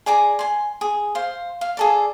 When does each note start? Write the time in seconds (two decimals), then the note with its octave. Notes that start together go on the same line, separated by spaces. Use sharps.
0.06 G#4 D5 G#5 A#5
0.39 G#5 C6
0.81 G#4
1.15 C5 F5
1.61 F5
1.77 G#4 A4 D5